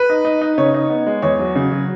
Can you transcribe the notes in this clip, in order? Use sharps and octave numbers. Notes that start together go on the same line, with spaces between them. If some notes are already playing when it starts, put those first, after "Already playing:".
Already playing: B4
D#4
D#4
D#4
C#3 C#5
D#4
B3
G#3
E2 C#5
F#3
C#3
F#3